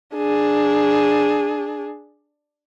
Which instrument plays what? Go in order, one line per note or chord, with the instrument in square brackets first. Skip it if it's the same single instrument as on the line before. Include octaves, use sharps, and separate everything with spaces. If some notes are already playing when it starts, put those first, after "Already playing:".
[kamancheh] D4 G#4